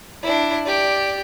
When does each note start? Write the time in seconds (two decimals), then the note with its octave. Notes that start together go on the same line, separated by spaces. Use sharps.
0.23 D4 E4
0.65 G4 D5